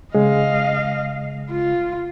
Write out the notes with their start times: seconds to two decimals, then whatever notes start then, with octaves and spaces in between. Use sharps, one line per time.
0.15 C#3 G#3 D#5 F5
1.50 F4